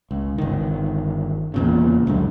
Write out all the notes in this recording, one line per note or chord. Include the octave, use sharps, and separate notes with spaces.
C#2
G1 D#3
E2 A#2 C#3
C#2 F#2 D3